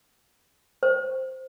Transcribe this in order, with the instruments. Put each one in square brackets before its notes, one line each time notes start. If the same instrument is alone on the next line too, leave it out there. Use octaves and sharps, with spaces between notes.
[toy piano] C5